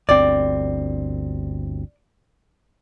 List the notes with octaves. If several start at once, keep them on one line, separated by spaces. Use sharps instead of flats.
G1 D2 C4 D5